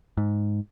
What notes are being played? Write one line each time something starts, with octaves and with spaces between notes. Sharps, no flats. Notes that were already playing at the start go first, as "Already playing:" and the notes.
G#2